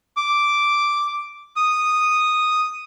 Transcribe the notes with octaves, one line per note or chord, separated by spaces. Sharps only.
D6
D#6